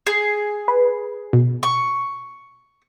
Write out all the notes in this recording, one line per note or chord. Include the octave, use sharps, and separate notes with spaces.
G#4
B4
B2
C#6